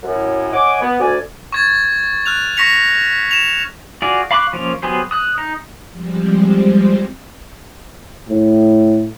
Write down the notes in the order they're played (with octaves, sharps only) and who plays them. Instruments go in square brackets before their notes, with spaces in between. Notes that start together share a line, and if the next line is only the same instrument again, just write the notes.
[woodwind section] F#2 A2
C#5 D#5 F#5 G#5 D6
B3
D2 D5 G#5
[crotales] C#6 G#6 A6
F6 F#6 F7
C#6 A#6 B6 C#7 F7
E7 F7
[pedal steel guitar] F4 F#4 G#4 D5
F5 B5 C#6 D6 F#6
F3 A#3 C#4
F#3 B3 G4 G#4 C5
D#6 F#6
D#4
[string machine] F3 G3 G#3 C4
[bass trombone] A2